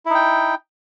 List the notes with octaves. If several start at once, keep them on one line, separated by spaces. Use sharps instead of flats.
D#4 E4 G5